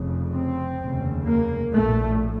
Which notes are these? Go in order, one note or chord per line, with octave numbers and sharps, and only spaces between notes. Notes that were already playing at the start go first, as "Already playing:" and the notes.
Already playing: F1 F2 C#3
C4
F1 D#2 C#3
A#3
A#1 A2 A3